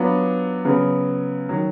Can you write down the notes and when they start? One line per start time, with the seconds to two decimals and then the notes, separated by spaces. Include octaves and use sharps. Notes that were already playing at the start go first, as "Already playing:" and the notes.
Already playing: F#3 B3 D4 F4
0.65 C#3 F#3 B3
1.49 D#3 F#3